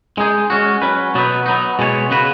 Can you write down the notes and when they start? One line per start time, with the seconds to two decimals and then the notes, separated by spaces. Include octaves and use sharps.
0.18 G#3 D#4 G#4
0.50 G#3 C#4 F#4
0.82 F#3 C#4 B4
1.15 B2 F#3 B3 D#4 B4
1.46 F#3 B3 D#4
1.79 B2 G#3 B3 G#4 C#5
2.10 C#3 B3 F#4 B4